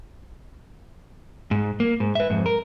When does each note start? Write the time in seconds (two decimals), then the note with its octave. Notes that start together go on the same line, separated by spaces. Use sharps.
1.51 G#2
1.80 A#3
2.00 G#2
2.15 B4 E5
2.30 F2 G#2
2.46 A#4